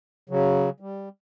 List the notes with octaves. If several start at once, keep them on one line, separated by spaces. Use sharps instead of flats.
C#3 F#3
G3